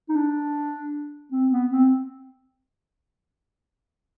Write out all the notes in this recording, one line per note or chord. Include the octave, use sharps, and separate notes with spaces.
D#4
D4
C4
B3
C4